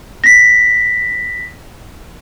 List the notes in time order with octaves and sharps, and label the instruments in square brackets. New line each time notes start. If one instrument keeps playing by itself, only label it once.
[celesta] A#6 B6